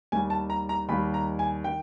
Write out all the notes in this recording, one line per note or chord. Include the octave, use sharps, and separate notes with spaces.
D#2 D#3 G3 G#5
A5
A#5
A#5
D#2 D#3 G3 B5
A#5
G#5
D#3 G5